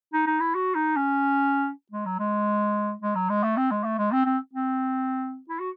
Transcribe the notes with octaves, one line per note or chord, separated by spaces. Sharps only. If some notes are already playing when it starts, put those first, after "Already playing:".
D#4
D#4
E4
F#4
D#4
C#4
G#3
F#3
G#3
G#3
F#3
G#3
A3
C4
G#3
A3
G#3
C4
C4
C4
E4
F#4